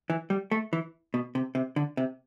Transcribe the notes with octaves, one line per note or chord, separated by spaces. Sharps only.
E3
G3
A3
E3
B2
C3
C3
D3
C3